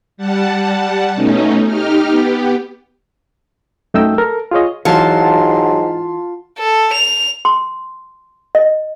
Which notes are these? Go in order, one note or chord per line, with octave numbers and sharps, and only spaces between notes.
G3 F#5 A5
B2 A3 C#4 D#4
D#4 G4 F6
B3 G4
F#2 A3 D#4 D#5 G5 E6
A4 A#4
F4 G#4 C#5 D#5
G#2 E3 F#3 F4 A5 C6
A4
F7
C6
D#5